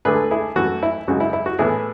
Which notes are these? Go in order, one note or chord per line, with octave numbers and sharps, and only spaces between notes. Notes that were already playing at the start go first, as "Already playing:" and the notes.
D2 D3 A3 G#4 B4
E4 G#4
F#2 E3 A3 F#4
E4
F#2 C#3 G#3 F#4
E4
E4
F#4
A2 E3 B3 E4 G#4